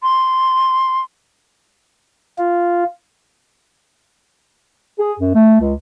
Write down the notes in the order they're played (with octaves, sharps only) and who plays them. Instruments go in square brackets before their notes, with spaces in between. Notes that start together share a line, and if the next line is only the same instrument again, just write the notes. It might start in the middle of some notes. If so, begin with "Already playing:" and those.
[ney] C6
[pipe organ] F4
[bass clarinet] G#4
F#2
A3
C#2